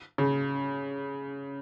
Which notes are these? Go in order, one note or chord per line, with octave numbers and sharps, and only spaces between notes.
C#3